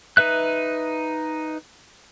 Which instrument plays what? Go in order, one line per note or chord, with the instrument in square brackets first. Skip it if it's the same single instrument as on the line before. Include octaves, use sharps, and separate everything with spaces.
[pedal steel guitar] D#4 B4 E5 F#6